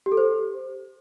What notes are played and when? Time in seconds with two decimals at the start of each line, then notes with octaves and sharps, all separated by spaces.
0.06 G4
0.12 A4
0.17 C5